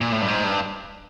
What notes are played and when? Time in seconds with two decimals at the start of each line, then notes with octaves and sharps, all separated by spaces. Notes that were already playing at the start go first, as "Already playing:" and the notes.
0.01 A#2
0.12 A2
0.22 G2
0.28 G#2
0.44 G2